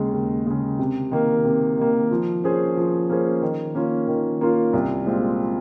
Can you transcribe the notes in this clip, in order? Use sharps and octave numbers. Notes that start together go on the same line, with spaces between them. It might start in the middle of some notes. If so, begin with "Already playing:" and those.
Already playing: D#2 C#3 G#3
D#2
C#3 G#3
C3
D#3 A#3
C3
D#3 A#3
F3
A#3 C#4 G#4 C5
F3
A#3 C#4 G#4 C5
D#3
A#3 C#4 F4
D#3
A#3 C#4 F4
C2
A#2 G#3 C4 F4